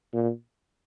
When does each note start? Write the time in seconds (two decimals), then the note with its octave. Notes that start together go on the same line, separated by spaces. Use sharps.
0.14 A#2